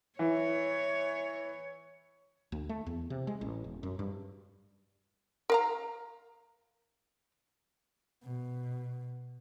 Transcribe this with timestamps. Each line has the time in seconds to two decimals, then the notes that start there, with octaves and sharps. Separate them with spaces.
0.19 E3 C#5
2.52 D2
2.69 A3
2.86 E2
3.10 C3
3.27 G#3
3.41 A1
3.64 E1
3.83 F#2
3.99 G2
5.50 A#4 F5 A#5
8.23 B2